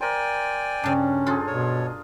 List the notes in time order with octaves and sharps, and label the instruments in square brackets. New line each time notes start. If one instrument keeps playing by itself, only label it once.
[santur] A#4 C5 [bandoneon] D5 G5 G#5
[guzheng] G2 C#3 [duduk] C#4 [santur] D4
[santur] F4 G#4 [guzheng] A4 C5
[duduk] B2 [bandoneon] C#5